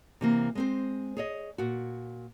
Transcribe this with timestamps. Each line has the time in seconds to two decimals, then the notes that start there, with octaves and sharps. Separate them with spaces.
0.21 C3 E3 A#3
0.55 G#3 C4 C5
1.17 G#4 C#5 D#5
1.58 A#2 F#4